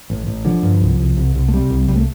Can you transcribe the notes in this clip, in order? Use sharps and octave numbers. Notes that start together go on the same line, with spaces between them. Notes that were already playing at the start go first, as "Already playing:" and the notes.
A1
A1
D3 F3
G2
C2
C2
C2
C2
A3
C3 G3
C2
C2 G3
A3